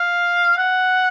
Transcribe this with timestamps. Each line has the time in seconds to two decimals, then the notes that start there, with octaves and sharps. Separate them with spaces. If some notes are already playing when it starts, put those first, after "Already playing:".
Already playing: F5
0.58 F#5